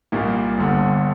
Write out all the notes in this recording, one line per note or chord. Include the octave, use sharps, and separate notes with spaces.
C2 A#2 G3 A#3
G1 G2 D3